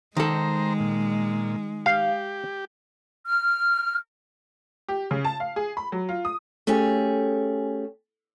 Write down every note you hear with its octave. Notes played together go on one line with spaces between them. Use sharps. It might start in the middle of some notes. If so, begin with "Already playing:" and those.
D#3 G#3 A4 C5 A#5
A#2
G4 F5
F6
G4
C#3
A5
F5
G#4
B5
F#3
F4
D#6
A3 C#4 G4 G#4